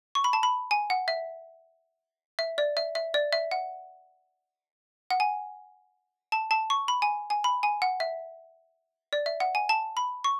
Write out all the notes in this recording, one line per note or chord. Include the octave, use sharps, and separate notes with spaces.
C#6
B5
A5
B5
G#5
F#5
E5
E5
D5
E5
E5
D5
E5
F#5
F#5
G#5
A5
A5
C#6
B5
G#5
G#5
B5
G#5
F#5
E5
D5
E5
F#5
G#5
A5
B5
C#6